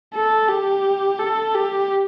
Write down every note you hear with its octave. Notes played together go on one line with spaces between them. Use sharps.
A4
G4
A4
G4